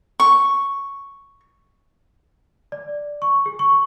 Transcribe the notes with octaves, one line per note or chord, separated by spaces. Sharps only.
C#6
D5
C#6
G#4
C#6